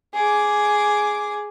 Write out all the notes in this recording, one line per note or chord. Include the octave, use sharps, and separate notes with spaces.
G#4 D6